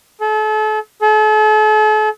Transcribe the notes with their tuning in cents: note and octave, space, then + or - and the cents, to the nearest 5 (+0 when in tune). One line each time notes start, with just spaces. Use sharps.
A4 -40
A4 -45